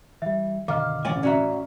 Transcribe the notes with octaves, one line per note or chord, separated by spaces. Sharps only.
E3 G3 E5
F#2 B2 D3 D#3 F5 D6 F6
A1 C#4 D5 G#5
C#4 F#4 D5 E5 A#5